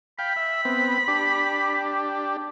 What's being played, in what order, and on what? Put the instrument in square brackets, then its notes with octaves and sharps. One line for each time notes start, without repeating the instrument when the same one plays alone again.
[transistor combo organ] F5 G5 [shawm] B5
[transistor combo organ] E5
B3 C4
D4 G4